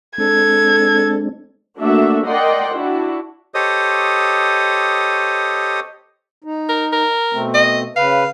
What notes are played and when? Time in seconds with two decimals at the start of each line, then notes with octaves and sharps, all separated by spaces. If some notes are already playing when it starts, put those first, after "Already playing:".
0.18 G#3 C4 D4 A4 G#6
1.78 A3 A#3 D4 F#4 A4 E5
2.27 A#4 D5 D#5 F#5 G5 C6
2.75 D4 E4 F#4
3.54 G4 A4 C5 C#5 D#5 D#6
6.44 D#4
6.69 A#4
6.93 A#4
7.33 B2 A3 C4
7.55 D#5
7.96 C#3 B4 F5